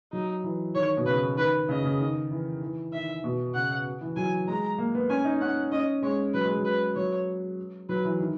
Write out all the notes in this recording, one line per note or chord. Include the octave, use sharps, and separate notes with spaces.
F#3 D#4
E3
D#3 C#5
B2
C#3 B4
D#3 B4
C#3 D#5
C#3
D#3
E3
E3
D#3 E5
B2
C#3 F#5
E3
F#3 G#5
G#3 A#5
A#3
B3
C#4 G#5
D#4
C#4 F#5
C#4 D#5
G#3 C#5
F#3 B4
G#3
F#3
B4
F#3 C#5
F#3 B4
E3
D#3